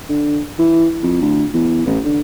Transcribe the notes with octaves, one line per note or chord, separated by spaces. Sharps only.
D3
E3
F2
D2
E2
A1
D3